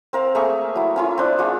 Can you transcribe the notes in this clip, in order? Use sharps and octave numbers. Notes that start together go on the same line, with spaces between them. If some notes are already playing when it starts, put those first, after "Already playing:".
C4 A#4 F5
A3 A#3 G#4 C#6
F#3 E4
C#4 E4 F4
C4 D4
G#3 F4 C#5